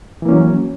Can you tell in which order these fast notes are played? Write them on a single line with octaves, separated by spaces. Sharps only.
E3 A#3 C#4 F#3